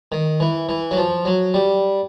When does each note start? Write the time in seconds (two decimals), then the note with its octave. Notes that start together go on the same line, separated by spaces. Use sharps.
0.12 D#3
0.40 E3
0.69 E3
0.91 F#3
0.97 F3
1.25 F#3
1.54 G3